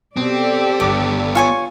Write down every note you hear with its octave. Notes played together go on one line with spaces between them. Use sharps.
B2 C4 G4 A4 D5
G1 B3 D4 D6 D7
F4 C#5 G#5 C#6